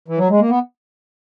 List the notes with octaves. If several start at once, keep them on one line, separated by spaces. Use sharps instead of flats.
E3
F#3
G#3
A#3
B3